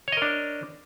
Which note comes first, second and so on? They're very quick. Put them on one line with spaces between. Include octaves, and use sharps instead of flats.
C#5 D#5 A#4 D4